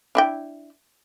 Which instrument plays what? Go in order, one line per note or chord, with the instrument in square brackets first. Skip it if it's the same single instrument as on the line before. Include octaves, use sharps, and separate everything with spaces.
[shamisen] D4 E4 G5